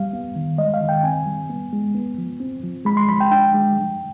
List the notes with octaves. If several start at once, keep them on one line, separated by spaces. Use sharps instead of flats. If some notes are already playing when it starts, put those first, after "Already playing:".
Already playing: G3 F5
B3
D#3
G#3 D#5
F5
D#3
G5
C4 G#5
G3
B3
G#3
B3
F3
C4
F3
G#3 B5
C6
F3 B5
G5
D4 G5
G#3
G3